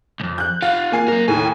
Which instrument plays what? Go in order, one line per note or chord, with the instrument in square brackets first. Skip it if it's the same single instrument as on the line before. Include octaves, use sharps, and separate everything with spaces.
[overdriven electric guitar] C2 F2
[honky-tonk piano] F#6 G6
[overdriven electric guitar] F4 F#5 [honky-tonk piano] F5
[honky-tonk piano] A#3 G#5 C7
[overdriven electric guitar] F#3 A#4 [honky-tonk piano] A#3
[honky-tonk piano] D#2 A2 [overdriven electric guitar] G#5